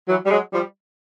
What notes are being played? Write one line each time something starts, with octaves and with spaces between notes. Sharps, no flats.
E3 F#3
G3
F#3 G#3
F3 G3